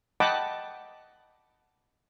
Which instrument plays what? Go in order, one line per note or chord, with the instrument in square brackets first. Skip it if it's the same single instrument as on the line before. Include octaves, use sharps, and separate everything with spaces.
[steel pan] D#5 F#5 G5 A5 B5 D6